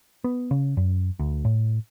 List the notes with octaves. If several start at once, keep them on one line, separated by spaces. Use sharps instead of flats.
B3
C#3
F#2
D2
A2